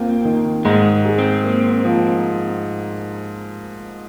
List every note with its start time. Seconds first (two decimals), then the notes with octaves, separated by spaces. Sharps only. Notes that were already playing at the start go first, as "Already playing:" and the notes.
Already playing: D#2 A#3 C4 F4
0.25 D#3
0.65 G#2 G#3
1.05 G#4
1.18 C4
1.44 A#3
1.85 F3